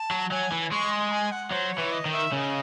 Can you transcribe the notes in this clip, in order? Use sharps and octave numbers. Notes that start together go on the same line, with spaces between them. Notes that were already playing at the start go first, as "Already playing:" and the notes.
Already playing: A5
F#3
F#3 G#5
E3
G#3 C#6
C6
G#5
F#5
F#3 C5
C#5
E3
D#5
D#3
E5
C#3 D#5 E5